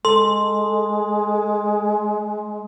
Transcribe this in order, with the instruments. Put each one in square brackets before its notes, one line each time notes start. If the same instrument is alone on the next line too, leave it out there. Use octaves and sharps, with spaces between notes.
[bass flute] G#3 [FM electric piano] A4 [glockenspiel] C6